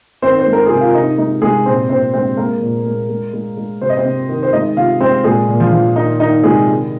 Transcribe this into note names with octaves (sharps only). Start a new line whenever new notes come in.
D#3 C4 C5
C5
G#3
A#4
C3 G#4
F4
C3 D#4
G#3 D#4
C3 G#3 G#4
A#2 C4 C5
A#2 C4 C5
G#3 C4 C5
G#3 A#3 A#4
A#2
G#3
G#3
G#3
G#3
C3 C5
D#5
C4 C5
C3
D#3
C5
G#3 D#4 D#5
C3 F4 F5
G#3 C4 C5
A#2 G#3 G#4
A#2
F3 F4
F3
D#3 D#4
D#3 D#4
C3 G#3 G#4
D#3